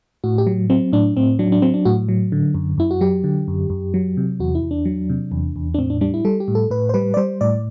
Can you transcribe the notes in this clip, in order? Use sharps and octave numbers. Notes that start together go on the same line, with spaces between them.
A2 F#4
G4
F#3
F#3 C4
A2 D4
A2 C4
F#3 D4
D4
F#3 C4
D4
A2 F#4
F#3
D3
F#2
F#2 E4
F#4
F#3 G4
D3
F#2
F#2
F#3
C3
E2 F#4
E4
E2
D4
F#3
C3
E2
E2
D4
A2 C4
D4
G3 D4
E4
G3 A4
G4
A2
A4
A2 B4
C5
G3 B4
D5
G3 C5
A2 D5